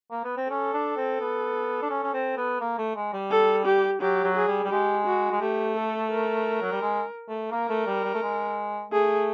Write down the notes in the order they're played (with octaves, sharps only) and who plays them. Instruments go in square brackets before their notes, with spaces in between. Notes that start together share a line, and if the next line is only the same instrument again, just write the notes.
[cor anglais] A#3
B3
C4
[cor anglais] C#4 [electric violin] A4
[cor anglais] D4
C4
B3
D4
C#4
C#4
C4
B3
A#3
A3
G#3
G3
[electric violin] A4
G4
[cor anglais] F#3 [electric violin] G4
[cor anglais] F#3
[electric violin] G#4
[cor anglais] G3
G3
[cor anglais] G#3 [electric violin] G4
[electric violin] F#4
[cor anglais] G#3
[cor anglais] A3 [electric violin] G4
[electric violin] A4
A#4
[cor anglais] F#3
G3
G#3
A3
[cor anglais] A#3 [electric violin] A#4
[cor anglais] A3
G3
G3
A3
G#3
[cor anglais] A3 [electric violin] G#4